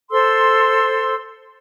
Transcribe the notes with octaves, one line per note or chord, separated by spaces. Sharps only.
A4 C5 C6 E6